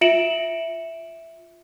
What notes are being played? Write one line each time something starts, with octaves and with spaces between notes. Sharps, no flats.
F4 E5 C#7 D7 E7 F#7